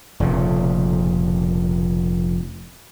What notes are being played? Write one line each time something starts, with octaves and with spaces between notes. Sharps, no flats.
F1 A#2 C#3